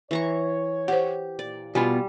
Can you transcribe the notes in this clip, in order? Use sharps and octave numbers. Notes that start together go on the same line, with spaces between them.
E3 C#5 A#5 C#6
G4 C5 F#5
A#2 D5
B2 G3 B3 F4 G#5